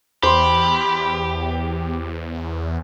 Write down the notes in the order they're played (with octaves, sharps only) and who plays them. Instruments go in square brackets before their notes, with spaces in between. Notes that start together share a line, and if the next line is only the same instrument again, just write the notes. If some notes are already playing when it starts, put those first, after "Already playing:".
[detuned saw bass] E2 [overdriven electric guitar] G4 [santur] C5 [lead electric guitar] B5